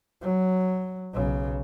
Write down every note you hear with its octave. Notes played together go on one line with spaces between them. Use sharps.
F#3
B1 C#3